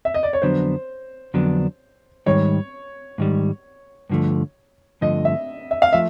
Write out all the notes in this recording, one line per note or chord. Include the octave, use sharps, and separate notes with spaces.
E5
D#5
D5
C#5
F2 D3 F#3 B3 D4 C5
F2 D3 F#3 B3 D4
G#2 D#3 G3 C#5
G#2 D#3 G3
G2 D3 F3 A3
G2 D3 F3 A3 D#5
E5
E5
F5
F3 A3 E5